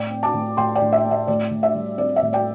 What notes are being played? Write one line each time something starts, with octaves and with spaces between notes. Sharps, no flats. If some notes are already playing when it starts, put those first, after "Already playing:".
Already playing: A2 D5 G5
C4
A5 D6
A2
A2 G5 C6
D5 G5
A2
E5
A3
E5
A2 D5
A2
E5
G3
C4 D5
E5
A2
D5 G5